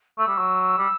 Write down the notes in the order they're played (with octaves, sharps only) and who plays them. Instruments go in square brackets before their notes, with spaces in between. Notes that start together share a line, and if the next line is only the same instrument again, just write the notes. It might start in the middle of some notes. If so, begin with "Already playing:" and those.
[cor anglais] A3 [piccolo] E6
[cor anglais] G3
F#3
G3